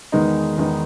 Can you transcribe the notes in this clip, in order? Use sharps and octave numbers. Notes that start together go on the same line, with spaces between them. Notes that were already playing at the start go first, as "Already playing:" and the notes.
E2 D#3 G#3 B3 D#4
E2 D#3 G#3 B3 D#4